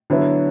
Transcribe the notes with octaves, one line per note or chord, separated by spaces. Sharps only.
D3 F#3 B3 E4